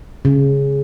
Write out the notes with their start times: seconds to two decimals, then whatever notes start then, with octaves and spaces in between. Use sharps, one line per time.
0.25 C#3